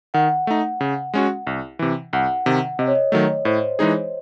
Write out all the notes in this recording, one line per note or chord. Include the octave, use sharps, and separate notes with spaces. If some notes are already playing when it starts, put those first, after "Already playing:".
D#3 F#5
A3 D#4
C#3
G#3 C#4 F#4
C2
C3 E3
C2 F#5
C3 D#3
C3 D#5
C#5
D#5
D#3 F#3 A3
A2 C5
E3 G#3 D#4 G#4